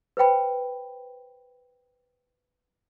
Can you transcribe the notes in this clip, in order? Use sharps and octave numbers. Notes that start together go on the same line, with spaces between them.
B4 C5 G5 B5